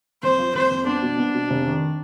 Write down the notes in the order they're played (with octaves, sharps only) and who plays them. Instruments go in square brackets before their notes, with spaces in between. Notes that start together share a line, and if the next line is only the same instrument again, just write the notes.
[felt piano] F2 [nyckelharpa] C5
[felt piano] F3
[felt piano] F2 [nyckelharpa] C5
[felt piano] F2
[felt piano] B3 [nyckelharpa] D4
[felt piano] B2
B3
B2
F1
D#3